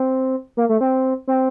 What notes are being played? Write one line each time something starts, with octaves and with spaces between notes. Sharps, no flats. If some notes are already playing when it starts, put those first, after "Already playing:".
Already playing: C4
A#3
A3
C4
C4